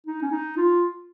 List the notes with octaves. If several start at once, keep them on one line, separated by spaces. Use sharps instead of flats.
D#4
C#4
D#4
F4